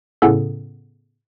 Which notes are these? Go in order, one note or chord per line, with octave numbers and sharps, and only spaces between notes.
A2 C#3 B3 C#4 A4